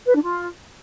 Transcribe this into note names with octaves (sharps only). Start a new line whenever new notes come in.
B4
D4
F4